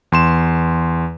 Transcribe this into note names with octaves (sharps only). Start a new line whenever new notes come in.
E2 C6 E7